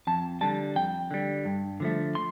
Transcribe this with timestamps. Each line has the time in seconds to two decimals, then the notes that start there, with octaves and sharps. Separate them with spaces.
0.07 F2 A5
0.41 D3 G3 A5
0.76 F2 G5
1.11 D3 G3
1.45 G2
1.80 D3 F3 A3
2.15 C6